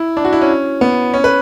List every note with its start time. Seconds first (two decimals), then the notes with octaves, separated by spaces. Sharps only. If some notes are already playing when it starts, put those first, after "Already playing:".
Already playing: E4
0.17 D4
0.25 F#4
0.33 E4
0.41 C#4
0.81 B3
1.14 C#4
1.24 B4